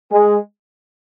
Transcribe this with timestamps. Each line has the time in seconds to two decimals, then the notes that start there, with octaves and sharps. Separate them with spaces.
0.11 G#3 G#4